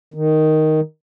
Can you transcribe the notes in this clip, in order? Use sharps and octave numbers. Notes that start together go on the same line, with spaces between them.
D#3